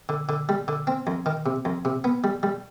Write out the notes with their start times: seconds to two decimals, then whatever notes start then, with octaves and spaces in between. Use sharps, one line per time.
0.09 D3
0.29 D3
0.49 G3
0.68 D3
0.87 C4
1.07 F2
1.26 D#3
1.46 C3
1.65 F2
1.85 C3
2.04 B3
2.24 G3
2.43 G3